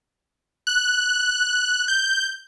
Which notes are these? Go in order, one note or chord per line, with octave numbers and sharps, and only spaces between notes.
F#6
G6